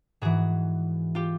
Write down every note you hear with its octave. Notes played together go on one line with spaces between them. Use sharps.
G#2 E3 F#4 G#4
F4 G4